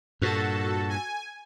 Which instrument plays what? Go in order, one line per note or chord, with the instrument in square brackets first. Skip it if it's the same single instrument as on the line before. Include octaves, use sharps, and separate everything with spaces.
[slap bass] G2 A#2 [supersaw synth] F#4 A4 A5
[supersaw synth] G#5